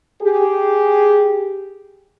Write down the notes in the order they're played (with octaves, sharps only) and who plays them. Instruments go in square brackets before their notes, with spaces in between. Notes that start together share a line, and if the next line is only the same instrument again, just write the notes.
[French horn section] G4 G#4